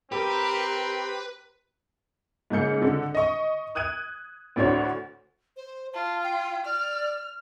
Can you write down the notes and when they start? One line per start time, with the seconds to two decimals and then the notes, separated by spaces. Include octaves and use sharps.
0.12 C4 G4 A#4 B4
2.50 G#2 C#3 A#3 G6 C#7
2.82 D3
3.15 D#5 C#6
3.75 D#6 F#6 G#6 D#7
4.56 D2 A2 D4 F#4 C5 C#5
5.57 C5
5.94 F4 A5
6.23 G5
6.65 D5 F6